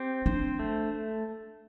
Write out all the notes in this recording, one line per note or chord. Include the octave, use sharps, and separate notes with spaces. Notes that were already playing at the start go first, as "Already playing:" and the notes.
Already playing: C4 G4
D4 C5
A3